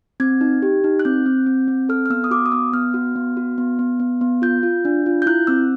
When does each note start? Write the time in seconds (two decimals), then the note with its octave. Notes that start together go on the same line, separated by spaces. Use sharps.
0.20 C4 G#6
0.41 D#4
0.62 G4
0.84 D#4
0.99 F#6
1.05 C4 G6
1.26 C4
1.46 C4
1.68 C4
1.89 A4 F6
2.06 F6
2.10 B3 E6
2.24 D#6
2.31 F#4 D6
2.46 D#6
2.52 B3 E6
2.73 B3 F6
2.94 F#4
3.16 B3
3.37 F#4
3.58 B3
3.79 B3
4.00 B3
4.21 B3
4.42 F4 G6
4.63 F4
4.85 D4
5.06 F4
5.22 G6
5.26 E4 F#6
5.47 C4 E6